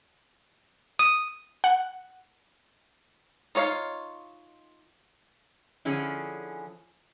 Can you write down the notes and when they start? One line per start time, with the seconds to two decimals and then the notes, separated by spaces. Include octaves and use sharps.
0.99 D#6
1.64 F#5
3.55 D#4 F4 C#5 D#5 F5
5.85 D3 F3 C#4 E4 G#4